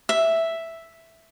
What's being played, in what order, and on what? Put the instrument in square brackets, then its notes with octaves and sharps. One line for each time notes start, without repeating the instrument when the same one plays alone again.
[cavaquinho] E5